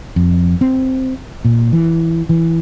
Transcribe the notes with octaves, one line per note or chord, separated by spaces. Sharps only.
F2
C4
A#2
E3
E3